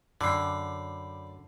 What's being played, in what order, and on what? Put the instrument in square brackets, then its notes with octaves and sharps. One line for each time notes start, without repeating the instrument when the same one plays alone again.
[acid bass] F#2 [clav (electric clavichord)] D3 [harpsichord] D5 G5 [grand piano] B5 C7